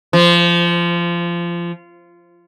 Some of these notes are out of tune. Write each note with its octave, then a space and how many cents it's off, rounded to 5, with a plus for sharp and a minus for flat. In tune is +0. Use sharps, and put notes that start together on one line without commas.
F3 -20